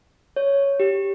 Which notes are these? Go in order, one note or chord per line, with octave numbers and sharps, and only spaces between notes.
C#5
G4